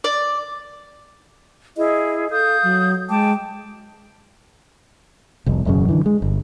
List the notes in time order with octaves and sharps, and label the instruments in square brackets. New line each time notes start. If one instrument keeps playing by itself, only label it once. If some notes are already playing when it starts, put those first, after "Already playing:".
[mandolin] D5
[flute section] E4 G#4 [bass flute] D#5
[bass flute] A4 [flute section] F5 D#6 G6
[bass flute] F#3
[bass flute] G#3 [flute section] G5 A5 D6
[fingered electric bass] F1 C2
E1 F#2 C#3
D3 E3
G#3
G1